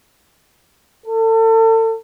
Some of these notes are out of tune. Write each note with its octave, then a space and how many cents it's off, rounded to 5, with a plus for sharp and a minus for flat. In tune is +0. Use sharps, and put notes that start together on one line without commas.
A4 +35